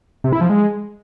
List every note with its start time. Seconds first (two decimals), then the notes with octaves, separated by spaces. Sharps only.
0.24 C3
0.33 E4
0.41 F3
0.49 G#3